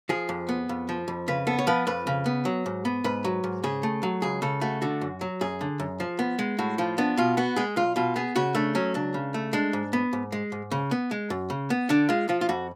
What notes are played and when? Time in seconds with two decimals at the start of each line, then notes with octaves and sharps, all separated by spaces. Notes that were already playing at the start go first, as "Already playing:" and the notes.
0.09 F3 G#4
0.29 F2
0.49 B3
0.69 F2
0.89 F3
1.08 F2
1.28 C#3 B4
1.47 B3 A4
1.59 C#5
1.67 F3 B4
1.87 F2 B4
2.07 C#3
2.26 B3
2.45 F#3
2.66 G#2
2.85 B3
3.04 G#2 B4
3.24 F#3
3.44 G#2
3.64 C#3 G#4
3.83 A3
4.03 F#3
4.22 C#2 G#4
4.42 C#3 A4
4.61 A3 F#4
4.82 D3 F#4
5.01 F#2
5.21 F#3
5.41 F#2 G#4
5.61 D3
5.80 F#2
6.00 F3
6.19 B3
6.39 G#3
6.59 A2 F#4
6.78 F3 F4
6.98 B3 D4
7.17 B2 F4
7.37 B3 F#4
7.56 G#3 G#4
7.76 B1 F4
7.96 B2 F4
8.16 B3 G#4
8.36 C#3 F#4
8.55 A3 D4
8.75 F#3 C#4
8.94 C#2 D4
9.14 C#3
9.34 A3
9.53 G#3 D4
9.73 G#2
9.93 B3
10.13 G#2
10.32 G#3
10.52 G#2
10.71 C#3
10.91 B3
11.11 G#3
11.30 F#2
11.50 C#3
11.70 B3
11.89 D3 D4
12.09 G#3 F4
12.29 F3 F4
12.41 F4
12.49 F2 F#4